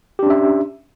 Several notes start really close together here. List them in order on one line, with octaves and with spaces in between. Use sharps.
G4 D4 C#4 E5